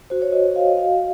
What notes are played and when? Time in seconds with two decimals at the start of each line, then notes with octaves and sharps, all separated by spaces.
0.10 F#4 C5
0.22 C#5
0.32 F#4 D#5
0.55 F#4 F5
0.67 D#5
0.77 F#4 F5